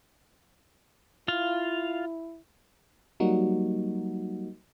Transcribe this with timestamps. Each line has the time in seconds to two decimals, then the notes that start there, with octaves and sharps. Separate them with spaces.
1.28 E4 F4 F5
3.20 F#3 G3 A#3 D#4 F#4